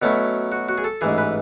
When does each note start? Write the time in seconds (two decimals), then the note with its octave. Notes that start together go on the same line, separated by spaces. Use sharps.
0.02 B2 F#3 A3 C#4 E4
0.52 F#4
0.69 F#4
0.78 G#4
0.84 A4
1.01 A1 G#2 E3 G#4
1.18 B4